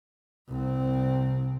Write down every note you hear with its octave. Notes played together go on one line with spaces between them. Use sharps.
C2 C4